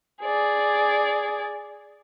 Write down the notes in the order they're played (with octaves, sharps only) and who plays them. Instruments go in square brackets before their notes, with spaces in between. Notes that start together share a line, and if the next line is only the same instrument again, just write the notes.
[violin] G#4 D5